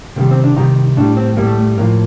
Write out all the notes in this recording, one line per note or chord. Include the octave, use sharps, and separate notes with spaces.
C3 D#3 G3 A#3
C4
D4
C3 D#3 G3 D#4
A2 G3 D4
C4
A2 G3 A#3
A3
A3
A2 F3 A#3